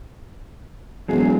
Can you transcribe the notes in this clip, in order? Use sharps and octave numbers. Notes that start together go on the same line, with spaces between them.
E1 F#3 G#4